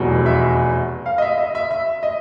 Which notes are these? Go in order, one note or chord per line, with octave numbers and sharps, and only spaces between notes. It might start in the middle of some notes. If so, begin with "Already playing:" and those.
Already playing: F1 E2 B2 F#3
E5
F5
D#5
E5
D#5
E5
E5
D#5